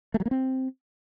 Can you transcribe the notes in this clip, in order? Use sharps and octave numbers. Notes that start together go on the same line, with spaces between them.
A3
F#3
A#3
C4